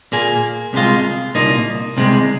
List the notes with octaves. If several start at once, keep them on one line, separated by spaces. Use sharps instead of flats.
A#2 A#3 G#4
C2 C3 G#3 F4
C2 A#2 A#3 D#4
C2 C3 G#3